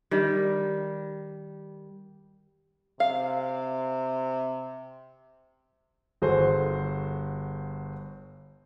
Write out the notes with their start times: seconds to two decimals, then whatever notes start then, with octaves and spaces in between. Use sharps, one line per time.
0.11 D#3 G3
3.00 C3 F5
6.22 G1 F#4 G#4 A4 C5